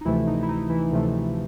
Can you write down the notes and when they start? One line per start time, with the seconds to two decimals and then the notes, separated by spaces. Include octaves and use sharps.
0.01 D#4
0.05 D2 C3 E3 F3 A3 E4
0.27 D#4
0.43 E4
0.49 D#4
0.70 E3 E4
0.91 D2 C3 F3 A3